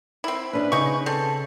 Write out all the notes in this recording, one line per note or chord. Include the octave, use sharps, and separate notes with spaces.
C4 E4
C#4 D4 B4 D#5
C#3 D#4 C#6
C4 A4